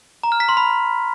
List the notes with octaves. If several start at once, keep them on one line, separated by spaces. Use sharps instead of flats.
A#5
F6
B6
C6
B5